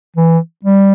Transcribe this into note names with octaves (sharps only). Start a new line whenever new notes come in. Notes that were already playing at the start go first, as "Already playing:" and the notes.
E3
G3